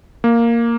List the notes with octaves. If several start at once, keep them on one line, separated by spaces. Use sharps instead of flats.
A#3